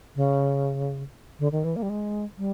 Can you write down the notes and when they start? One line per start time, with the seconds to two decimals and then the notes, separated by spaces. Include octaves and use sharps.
0.16 C#3
1.39 D3
1.52 D#3
1.64 E3
1.76 A#3
1.82 G3
1.89 G#3
2.38 G3